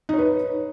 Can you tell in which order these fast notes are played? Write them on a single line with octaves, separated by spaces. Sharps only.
D#4 C#5 B4